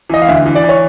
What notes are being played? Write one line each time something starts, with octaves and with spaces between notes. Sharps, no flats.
E3 D#5
F5
D2 E5
E3
D5
E3
C#5